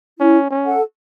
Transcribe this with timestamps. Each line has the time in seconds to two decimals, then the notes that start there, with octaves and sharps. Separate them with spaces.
0.19 C#4 E4
0.50 C#4
0.65 A4 F#5